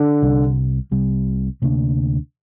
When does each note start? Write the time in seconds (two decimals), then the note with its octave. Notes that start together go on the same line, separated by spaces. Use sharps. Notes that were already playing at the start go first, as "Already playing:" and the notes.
Already playing: D3
0.22 C2 C3 G3
0.91 C2 C3 G3
1.62 D2 C3 A#3 D4